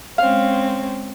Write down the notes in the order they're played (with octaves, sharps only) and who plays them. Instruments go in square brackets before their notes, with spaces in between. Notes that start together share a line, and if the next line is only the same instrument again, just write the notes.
[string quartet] G#3 C4 C#4 [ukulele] F5